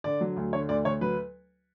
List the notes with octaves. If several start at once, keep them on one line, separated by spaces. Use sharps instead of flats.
D3 D5
F#3
D2
D3 C#5
D2 D5
D2 C#5
F#3 B4